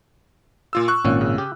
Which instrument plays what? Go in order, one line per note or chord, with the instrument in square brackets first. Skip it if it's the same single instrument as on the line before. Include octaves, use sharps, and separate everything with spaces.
[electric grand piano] A#2 F4 E6
C#6 F#6
[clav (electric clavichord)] G#1 A#2 C#4
[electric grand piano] C#3
[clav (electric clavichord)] G4